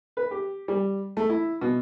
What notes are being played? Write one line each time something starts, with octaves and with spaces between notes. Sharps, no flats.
B4
G4
G3
A3
E4
B2